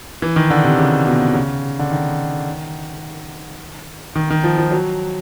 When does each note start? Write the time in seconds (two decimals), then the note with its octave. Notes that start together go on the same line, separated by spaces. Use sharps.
0.22 E3
0.36 D#3
0.50 D3
0.64 C3
0.79 C#3
1.06 B2
1.34 C#3
1.79 D3
1.91 D#3
4.15 D#3
4.30 D#3
4.44 F3
4.58 F3
4.71 F#3